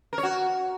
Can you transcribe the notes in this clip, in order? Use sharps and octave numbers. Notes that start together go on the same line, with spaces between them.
A#4
C#5
F#4